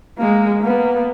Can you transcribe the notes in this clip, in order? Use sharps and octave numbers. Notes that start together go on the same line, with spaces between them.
G#3 A#3
A#3 B3